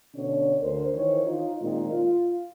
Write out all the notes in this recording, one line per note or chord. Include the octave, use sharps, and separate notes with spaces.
B2 D3 C#4 D4 C#5
D2 A#4 C5
D#3 E3 C5 C#5
D#4 F4
A#2 D#3 G#3 C4 D#4 F4
F4